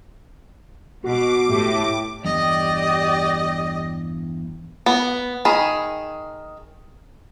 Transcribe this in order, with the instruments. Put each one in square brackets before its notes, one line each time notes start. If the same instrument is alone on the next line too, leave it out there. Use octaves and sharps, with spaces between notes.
[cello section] B2 [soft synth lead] F#4 [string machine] D6
[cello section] A2 [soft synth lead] G4
[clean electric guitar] E2 G2 [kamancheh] G4 D5 [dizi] D#5
[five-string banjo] B3
D#3 G#4 B5